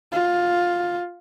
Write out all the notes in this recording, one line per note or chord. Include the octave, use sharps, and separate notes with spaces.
F4